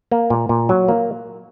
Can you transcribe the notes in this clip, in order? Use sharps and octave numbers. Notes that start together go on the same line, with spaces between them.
A#3
A#2
A#2
F#3
A#3